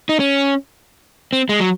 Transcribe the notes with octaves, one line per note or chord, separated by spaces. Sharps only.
D#4
C#4
C4
G#3
F#3